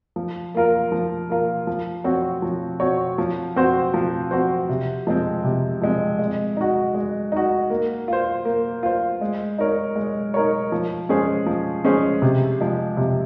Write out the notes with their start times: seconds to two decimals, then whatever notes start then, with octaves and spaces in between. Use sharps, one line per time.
0.16 F3
0.55 A#3 F4 A#4
0.92 F3
1.30 A#3 F4 A#4
1.67 F3
2.04 C4 F#4 C#5
2.42 F3
2.80 C4 F#4 C#5
3.18 F3
3.56 C4 F#4 C5
3.94 F3
4.31 C4 F#4 C5
4.69 C3
5.07 F3 G#3 C4
5.44 C3
5.81 F3 G#3 C4
6.19 G#3
6.57 D#4 F#4
6.95 G#3
7.32 D#4 F#4
7.70 A#3
8.08 F4 C5
8.45 A#3
8.83 F4 C5
9.21 G#3
9.58 D#4 A#4 C#5
9.96 G#3
10.34 D#4 A#4 C#5
10.72 F3
11.09 G#3 C#4 G#4 C5
11.46 F3
11.84 G#3 C#4 G#4 C5
12.22 C3
12.61 F3 G#3
12.97 C3